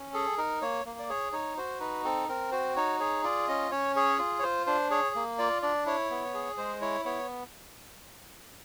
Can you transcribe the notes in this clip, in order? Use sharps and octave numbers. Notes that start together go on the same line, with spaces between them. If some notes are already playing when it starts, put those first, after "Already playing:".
Already playing: C#4
G#4 A4
D#4 A#4
A#3 C#5
A#3
D5
G#4 C#5
D#4 C#5
F#4 C5
D#4 B4
C4 A4
C4 A#4
F#4 C5
D#4 C#5
G#4 C#5
F4 D5
C#4 D#5
C#4 C#5
G#4 C#5
F4
C#5
F4 C5
D4 C5
G#4 C#5
A#3
F4 D5
D4 D5
E4 C#5
B3
G#4
G#3 C5
E4 C#5
B3 C#5